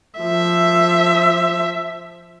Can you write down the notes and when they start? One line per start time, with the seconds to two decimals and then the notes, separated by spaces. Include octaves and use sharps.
0.20 F3 E5